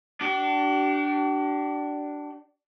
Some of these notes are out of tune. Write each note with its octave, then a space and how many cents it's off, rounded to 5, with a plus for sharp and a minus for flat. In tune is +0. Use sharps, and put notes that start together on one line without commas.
D4 +0 G4 -45